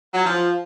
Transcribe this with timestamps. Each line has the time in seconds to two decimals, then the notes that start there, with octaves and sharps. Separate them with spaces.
0.14 F#3
0.24 F3